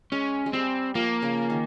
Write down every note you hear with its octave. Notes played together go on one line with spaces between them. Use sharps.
G#3 C#4
G#3
G3 C4
F3 A#3
C#3
D#3